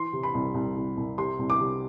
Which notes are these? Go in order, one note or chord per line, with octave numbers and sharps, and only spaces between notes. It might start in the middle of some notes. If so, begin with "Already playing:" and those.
Already playing: E3 C6
C3
B5
C2
C2
C2
C2
C3 C6
C2
D6
C3